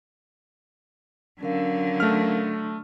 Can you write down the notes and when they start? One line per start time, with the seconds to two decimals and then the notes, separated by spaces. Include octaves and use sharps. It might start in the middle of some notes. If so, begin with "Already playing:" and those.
1.41 D3 F#3 C#4 A#4 F5
2.00 A3 F6